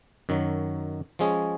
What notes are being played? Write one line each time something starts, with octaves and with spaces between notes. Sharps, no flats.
F#2 D#3 F#3
F3 G#3 C#4 G#4 C#5